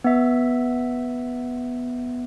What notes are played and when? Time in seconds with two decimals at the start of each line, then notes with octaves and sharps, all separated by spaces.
0.04 B3 E5